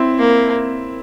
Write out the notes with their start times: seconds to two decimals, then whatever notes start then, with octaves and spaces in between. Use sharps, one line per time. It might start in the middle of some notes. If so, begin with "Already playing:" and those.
Already playing: C4 E4
0.19 A#3